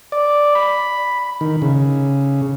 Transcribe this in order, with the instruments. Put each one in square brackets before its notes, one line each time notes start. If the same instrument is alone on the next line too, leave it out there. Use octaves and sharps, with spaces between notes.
[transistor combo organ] D5
B5
D#3
C#3